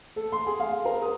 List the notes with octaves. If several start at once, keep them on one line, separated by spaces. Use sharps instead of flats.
A4
C6
G#4
F5
A#4
D#6